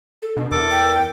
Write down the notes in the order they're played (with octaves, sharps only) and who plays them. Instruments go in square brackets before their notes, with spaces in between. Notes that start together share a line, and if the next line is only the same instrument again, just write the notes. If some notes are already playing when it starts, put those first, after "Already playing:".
[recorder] A4
[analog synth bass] B2 [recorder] D4
[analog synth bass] E2 [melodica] A4 D6 [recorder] A#4
[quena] G5